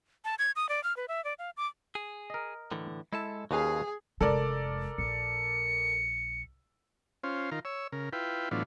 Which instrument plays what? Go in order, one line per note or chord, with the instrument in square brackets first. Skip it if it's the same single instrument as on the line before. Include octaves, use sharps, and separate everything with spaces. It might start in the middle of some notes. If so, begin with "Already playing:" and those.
[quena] A5
G#6
D#6
D5
F6
B4
E5
D5
F5
D6
[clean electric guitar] G#4
[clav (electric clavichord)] A#4 D#5
[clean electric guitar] A2 D3 E3
[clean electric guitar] G#3 A4 A5 [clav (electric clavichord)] E4
[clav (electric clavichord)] D#2 C#4 [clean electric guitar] F#4 B4 F5 [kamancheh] G#4
[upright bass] F1 G#3 [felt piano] A4 A#4 D5
[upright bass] A#1 [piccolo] C#7
[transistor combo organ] C#4 F4 C5
D#3 F4 A#4
C#5 E6
C#3 A#4
E4 F4 B4 G5
A2 E3 F#3 B3 D4 F4